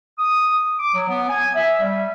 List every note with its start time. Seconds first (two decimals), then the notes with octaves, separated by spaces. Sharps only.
0.18 D#6
0.78 D6
0.93 F#3
1.09 B3
1.29 G#5
1.55 E5
1.80 G3